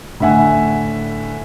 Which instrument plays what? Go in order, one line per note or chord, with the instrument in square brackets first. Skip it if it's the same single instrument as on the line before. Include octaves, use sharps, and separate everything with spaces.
[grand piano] A2 D3 E5 F#5 G#5